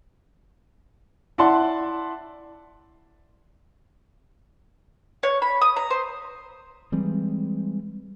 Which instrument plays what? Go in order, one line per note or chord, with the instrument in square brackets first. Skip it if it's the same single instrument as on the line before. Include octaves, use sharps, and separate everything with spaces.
[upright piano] E4 D5 F#5 A5 C6
[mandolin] C#5
B5
D#6
A#5
C5
[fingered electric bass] E3 G3 G#3 C4